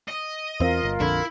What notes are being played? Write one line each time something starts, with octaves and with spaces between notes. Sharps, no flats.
D#5
E2 C4 F4 A#4 F5
G1
A#1 F2 D3 E4